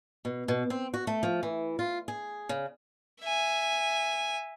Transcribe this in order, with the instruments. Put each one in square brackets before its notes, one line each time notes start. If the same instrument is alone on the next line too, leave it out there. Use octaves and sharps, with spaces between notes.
[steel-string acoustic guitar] B2
B2
C4
F#4
A3
F3
E3
F4
G#4
C#3
[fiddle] E5 G#5